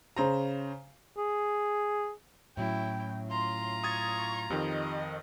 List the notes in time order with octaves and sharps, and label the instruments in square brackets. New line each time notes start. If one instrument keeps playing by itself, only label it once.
[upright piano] C#3 C5 A#5
[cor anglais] G#4
[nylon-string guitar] A2 F#3 C#4 [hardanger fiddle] E4 [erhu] G5
[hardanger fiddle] F4 A#5 [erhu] C6
[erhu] C#6 [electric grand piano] D#6 G#6 A6
[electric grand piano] F2 D#3 [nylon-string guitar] G4 [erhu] D#5